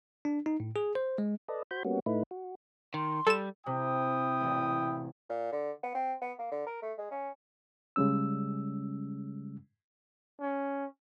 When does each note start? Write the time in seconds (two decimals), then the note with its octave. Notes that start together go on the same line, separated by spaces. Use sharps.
0.25 D4
0.46 D#4
0.60 A2
0.76 G#4
0.95 C5
1.18 G#3
1.48 A4 B4 D5 D#5
1.71 F#4 C5 B5 G6
1.85 G3 A#3 B3 C#4 F#4
2.06 A2 A3 D#4 E4 B4
2.31 F#4
2.94 D#3 C6
3.27 G3 A4 E7
3.66 C3 E4 G5 D#6
4.40 E1 A1
5.29 A#2
5.52 D3
5.83 B3
5.94 C4
6.21 B3
6.39 A#3
6.51 D3
6.66 A#4
6.82 A3
6.98 G#3
7.11 C#4
7.96 C#3 G3 G#3 C#4 E6
10.41 C#4